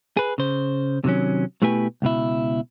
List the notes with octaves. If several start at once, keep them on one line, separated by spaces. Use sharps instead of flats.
G#4 B4
C#3 C5
C3 D#3 F3 F#3 C#4
B2 A3 E4 G4 B4 G#5
C#2 B2 E4